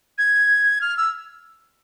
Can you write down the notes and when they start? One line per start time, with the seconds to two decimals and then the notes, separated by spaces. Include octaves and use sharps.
0.18 G#6
0.81 F6
0.97 E6